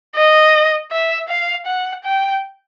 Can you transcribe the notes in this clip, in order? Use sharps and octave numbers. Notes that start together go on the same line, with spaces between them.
D#5
E5
F5
F#5
G5